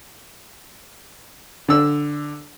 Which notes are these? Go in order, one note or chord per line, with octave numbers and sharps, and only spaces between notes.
D3 E6